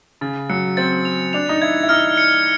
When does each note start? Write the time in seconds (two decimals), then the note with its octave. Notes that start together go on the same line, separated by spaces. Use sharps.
0.21 C#3 A6
0.49 F#3 C#7
0.77 C4 A6
1.05 F7
1.33 D4 F7
1.49 D#4
1.62 E4 G#6
1.83 E4
1.89 D#4 F6
2.17 C#7